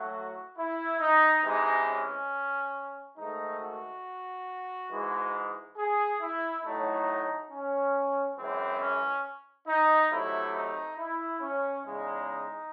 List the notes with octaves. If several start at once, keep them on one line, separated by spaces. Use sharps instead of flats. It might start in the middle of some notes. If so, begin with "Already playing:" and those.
Already playing: A2 F#3 A3 F#4
E4
D#4
C3 E3 G#3 D#4
C#4
G#2 D#3 A3 D#4
F#4
G#2 E3 G#3
G#4
E4
A2 F#3 A3 D#4
C#4
F#2 E3 G#3 C4
C#4
D#4
C3 F#3 A3 E4
D#4
E4
C#4
E2 C#3 G#3 D#4